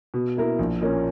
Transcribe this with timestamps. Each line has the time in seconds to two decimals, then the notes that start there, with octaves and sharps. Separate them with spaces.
0.14 B2
0.37 A#3 E4 A#4
0.59 A#1
0.81 A#2 A#3 C#4